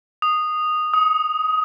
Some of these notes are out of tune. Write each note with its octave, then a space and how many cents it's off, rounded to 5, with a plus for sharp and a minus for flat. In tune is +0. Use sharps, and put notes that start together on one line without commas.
D#6 -10
D#6 +20